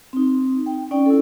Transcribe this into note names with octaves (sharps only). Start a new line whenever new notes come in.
C4 D#4
G5
C#4 D#4 D5 G5
E4 A4